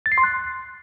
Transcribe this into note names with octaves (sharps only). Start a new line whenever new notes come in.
A6
C7
C6
F#6